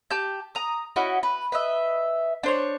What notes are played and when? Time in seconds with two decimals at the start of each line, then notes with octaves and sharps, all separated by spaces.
0.11 G4 A5 G6
0.55 A#5 D#6
0.96 C#4 E4 F#4 D#5
1.23 B4
1.52 B4 D#5 E5
2.43 D4 C5 C#5